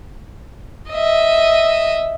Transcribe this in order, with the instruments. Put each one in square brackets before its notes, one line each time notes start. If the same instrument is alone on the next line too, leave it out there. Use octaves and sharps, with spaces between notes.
[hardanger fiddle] D#5 E5